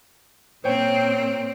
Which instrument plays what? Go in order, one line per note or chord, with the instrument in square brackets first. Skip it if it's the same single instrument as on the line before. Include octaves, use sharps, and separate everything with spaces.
[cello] A#2 C4 [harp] C5 C#5 G5